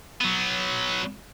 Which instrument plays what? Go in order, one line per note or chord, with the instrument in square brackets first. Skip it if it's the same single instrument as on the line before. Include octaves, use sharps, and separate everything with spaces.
[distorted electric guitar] F#3 B3